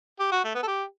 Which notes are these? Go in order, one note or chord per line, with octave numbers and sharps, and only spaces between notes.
G4
F#4
A3
B3
A4
G4